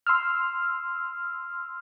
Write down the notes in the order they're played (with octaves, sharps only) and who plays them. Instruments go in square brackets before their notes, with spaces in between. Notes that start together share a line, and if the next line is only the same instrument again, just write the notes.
[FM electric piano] C6 E6 F6